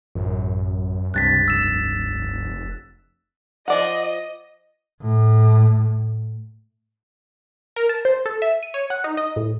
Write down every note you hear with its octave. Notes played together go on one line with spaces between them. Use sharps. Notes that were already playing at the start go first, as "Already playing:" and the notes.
A1 F#2
C#2 G2 C3 F#6 A6 B6
F1 E6 E7
F3 D5 D#5 F#5
A2
A#4
A5
C5
A4
E5
D#7
C#5
F#5
D#4
D#5
A2